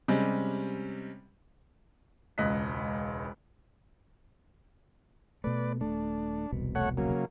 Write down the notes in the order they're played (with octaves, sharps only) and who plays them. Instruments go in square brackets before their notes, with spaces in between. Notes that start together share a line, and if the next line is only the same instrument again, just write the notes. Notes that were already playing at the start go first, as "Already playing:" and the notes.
[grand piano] C3 G3 G#3 C#4
E1 C#2 D#5 F#6 B6
[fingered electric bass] B2 A3 [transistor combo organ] B4 D5
[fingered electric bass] D#1 A3 [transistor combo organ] D4
[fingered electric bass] E1 C2 B2
[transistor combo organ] A3 C#5 F#5
C#3 F#3 A#3